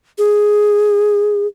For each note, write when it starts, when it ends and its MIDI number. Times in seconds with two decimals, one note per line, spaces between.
0.18 1.47 68